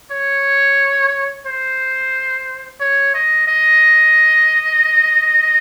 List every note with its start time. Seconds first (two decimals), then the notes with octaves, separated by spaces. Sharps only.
0.11 C#5
1.47 C5
2.80 C#5
3.14 D#5
3.48 D#5